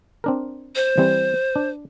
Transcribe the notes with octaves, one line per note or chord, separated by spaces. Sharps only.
C4 D4 A#4
C5
E3 G3 C4
D4